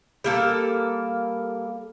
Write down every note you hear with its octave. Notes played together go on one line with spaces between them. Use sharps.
G3 A#3 A4